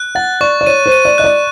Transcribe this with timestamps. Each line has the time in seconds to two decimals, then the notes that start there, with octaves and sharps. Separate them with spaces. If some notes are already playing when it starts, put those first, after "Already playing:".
Already playing: F#6
0.15 F#5 A6
0.41 D5 C#6
0.61 D5
0.66 C#5 D#7
0.86 C5
0.92 D#7
1.05 D5
1.18 D#5 F#6
1.24 D5